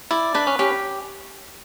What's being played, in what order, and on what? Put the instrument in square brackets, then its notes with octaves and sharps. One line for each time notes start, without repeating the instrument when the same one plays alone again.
[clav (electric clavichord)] E4 [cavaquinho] D5
[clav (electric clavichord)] D4 [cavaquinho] B4
[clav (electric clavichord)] C#4
[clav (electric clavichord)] C#4 [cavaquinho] G4